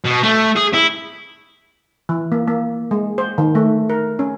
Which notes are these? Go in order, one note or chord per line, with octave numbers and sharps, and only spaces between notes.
B2
A3
G#4
E4
E3
A#3
A#3
G#3
C5
D#3
A3
A#4
C#4